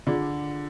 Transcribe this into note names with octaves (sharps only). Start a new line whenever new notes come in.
D3 F4 G#4 D5